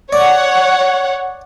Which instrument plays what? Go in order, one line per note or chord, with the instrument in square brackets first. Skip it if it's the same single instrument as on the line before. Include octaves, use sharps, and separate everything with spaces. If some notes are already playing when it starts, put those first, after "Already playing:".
[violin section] C#5 F#5 [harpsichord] D5